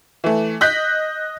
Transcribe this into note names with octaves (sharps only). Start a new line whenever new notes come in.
E3 A3
D#5 F#6 G6 B6